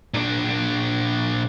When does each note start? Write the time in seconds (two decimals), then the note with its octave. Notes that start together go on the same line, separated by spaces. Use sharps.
0.14 A#2 D4